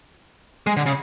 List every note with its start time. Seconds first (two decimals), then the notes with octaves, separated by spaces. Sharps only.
0.67 G#3
0.77 D3
0.86 C#3